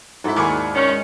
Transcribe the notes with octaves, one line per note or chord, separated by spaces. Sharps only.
G#2 E4 F#4 A4 E5
D#2 E4 G#4 D5 C#6
D#3 C#4
G#3